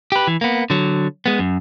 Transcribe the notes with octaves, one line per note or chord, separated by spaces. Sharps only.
G4 B4
E3
A#3 B3
D3 F#3
G#3 B3
F#2